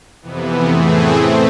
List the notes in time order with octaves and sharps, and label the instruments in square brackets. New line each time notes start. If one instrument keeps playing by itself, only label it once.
[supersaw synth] F2 C3 E3 B3
A2 E3 A3 C4 G#4
B2 A3 C4